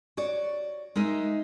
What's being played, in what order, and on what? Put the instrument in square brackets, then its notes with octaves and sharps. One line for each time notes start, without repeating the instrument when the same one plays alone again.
[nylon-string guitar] F#4 C#5 D5
G#3 D#4 A#4 E5